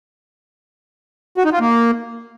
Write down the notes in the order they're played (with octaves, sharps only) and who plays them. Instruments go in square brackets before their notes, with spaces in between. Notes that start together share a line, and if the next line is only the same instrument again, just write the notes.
[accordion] F#4
D#4
F4
A#3